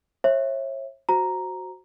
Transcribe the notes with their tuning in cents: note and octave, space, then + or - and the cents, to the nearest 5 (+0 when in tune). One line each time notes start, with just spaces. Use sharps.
C#5 -40 E5 +0
F#4 +0 C5 +0 A#5 +0